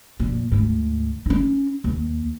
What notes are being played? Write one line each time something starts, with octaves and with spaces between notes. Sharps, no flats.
F2 A#2
D2 G#2
C#4 D#4
D#2